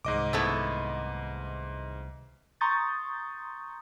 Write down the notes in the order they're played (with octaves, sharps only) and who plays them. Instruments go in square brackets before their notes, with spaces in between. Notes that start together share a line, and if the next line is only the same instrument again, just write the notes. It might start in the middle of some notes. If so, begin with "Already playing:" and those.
[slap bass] C2 D#3 [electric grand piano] G#2 D#5 D6
[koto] A3 B3 E4
[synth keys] A#5 C6 C#6 D#6 G6 A6